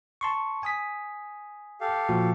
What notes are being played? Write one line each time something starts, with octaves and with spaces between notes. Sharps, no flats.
A5 C6 C#6
G#5 D#6 B6
G4 A4 F5
A#2 F3 F#4